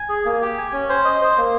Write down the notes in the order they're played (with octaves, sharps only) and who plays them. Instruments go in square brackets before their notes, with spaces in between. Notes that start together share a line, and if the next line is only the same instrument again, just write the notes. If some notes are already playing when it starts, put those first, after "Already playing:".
Already playing: [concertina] G#5
G#4
A#3
G4
G#5
C#4
C5
D#5
C5
A#3